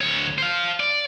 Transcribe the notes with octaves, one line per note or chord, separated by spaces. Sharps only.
D2 C#5
C5 F5
D5